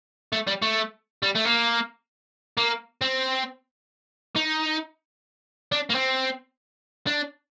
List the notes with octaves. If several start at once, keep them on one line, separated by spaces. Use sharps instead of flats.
A3
G3
A3
G3
A3
A#3
A#3
C4
D#4
D4
A#3
C4
D4